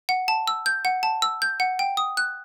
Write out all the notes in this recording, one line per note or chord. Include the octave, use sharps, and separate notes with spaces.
F#5
A5
E6
G6
F#5
A5
E6
G6
F#5
G5
D#6
F#6